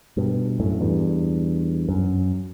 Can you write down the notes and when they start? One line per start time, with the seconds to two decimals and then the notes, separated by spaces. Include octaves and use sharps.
0.17 G2 B2
0.60 F#2 A2
0.81 E2 G2
1.89 F#2